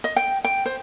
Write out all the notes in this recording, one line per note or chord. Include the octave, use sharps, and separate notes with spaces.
D#5
G5
G5
C5